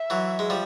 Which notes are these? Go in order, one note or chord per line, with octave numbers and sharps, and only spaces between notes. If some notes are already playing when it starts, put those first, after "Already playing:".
Already playing: E5
E3 F#3
G#3
F3 G3